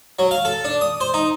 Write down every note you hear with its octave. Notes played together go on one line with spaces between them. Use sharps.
F#3
F5
A4
D4
D#6
C5
D#4